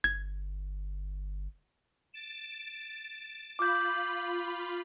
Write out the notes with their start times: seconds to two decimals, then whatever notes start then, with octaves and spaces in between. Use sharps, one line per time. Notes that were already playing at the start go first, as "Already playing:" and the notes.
0.04 G1 G#6
2.13 A6 D7 E7
3.59 F4 B5 D6 G6